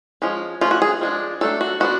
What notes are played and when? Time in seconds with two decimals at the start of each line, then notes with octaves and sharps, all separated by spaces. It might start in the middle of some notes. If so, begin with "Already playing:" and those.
0.22 F3 G#3 C#4
0.61 F3 A3 C#4 F4
0.71 F#4
0.82 G#4
1.01 F3 G#3 D4
1.41 F#3 A3 D4 A4
1.61 F#4
1.80 F3 B3 D4 F#4